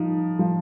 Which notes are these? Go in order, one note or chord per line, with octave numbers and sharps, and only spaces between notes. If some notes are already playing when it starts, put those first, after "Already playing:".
Already playing: F3 D#4
F3